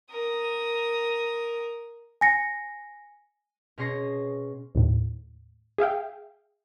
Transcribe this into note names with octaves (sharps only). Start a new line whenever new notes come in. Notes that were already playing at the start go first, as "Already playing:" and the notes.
A#4 D#6
G#5 A#6 C#7
B2 C#4 G#4 C6 C#6 A#6
D#2 A2
G#4 E5 F5 G5